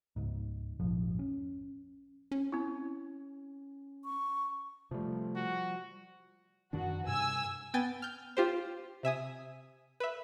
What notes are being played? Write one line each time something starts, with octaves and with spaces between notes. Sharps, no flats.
C#2 G#2
A#1 F2 G#2 F3
C#4
C#4
C4 E4
C#6
C3 F3 G3 A3
F#4
F#2 D#3 D4 F#4
G2 C3 G#5 E6
B3 G5 G#5 A6
F6 G6
F4 G4 C5
C3 E5 G#5 D#6
B4 E5